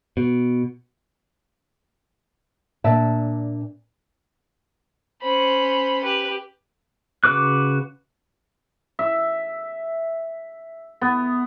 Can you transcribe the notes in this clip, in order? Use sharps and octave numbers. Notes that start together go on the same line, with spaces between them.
B2
A#2 D4 E5 A5
C#4 C5 B5
G4 B4
C#3 F#4 B4 D6 F#6
E5
B3